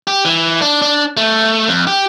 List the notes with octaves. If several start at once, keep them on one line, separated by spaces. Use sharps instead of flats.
G4
E3
D4
D4
A3
F2
G4